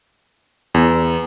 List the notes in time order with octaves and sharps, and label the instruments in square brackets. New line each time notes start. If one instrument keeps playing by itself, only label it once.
[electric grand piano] E2